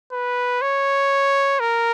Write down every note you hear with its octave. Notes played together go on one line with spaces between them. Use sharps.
B4
C#5
A#4